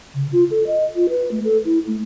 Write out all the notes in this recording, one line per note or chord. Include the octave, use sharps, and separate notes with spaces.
C#3
F4
A4
D#5
F4
B4
A3
A4
E4
A3